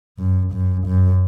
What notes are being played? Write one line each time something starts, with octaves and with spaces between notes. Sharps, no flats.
F#2
F#2
F#2